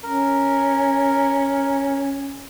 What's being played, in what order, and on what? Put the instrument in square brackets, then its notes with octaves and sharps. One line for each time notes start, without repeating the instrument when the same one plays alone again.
[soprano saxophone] C#4 [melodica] A#4